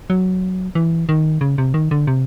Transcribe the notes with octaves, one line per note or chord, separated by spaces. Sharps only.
F#3
E3
D#3
C#3
C3
D#3
D3
C3